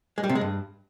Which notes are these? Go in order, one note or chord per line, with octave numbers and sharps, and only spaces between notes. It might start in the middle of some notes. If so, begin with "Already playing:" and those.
G#3
G3
C3
G#3
G2